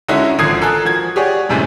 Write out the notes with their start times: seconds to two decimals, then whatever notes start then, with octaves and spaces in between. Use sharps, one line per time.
0.09 D3 G#3 C#4 D#4 E4 F#4
0.39 G#1 D3 F3 D#6 G#6 C7
0.62 A4 A#4 G#5 A5 F#6
0.85 F3 F#4 G#6
1.16 G4 G#4 C#5 D5 F#5
1.49 F#2 A2 C3 E3 G#3 A3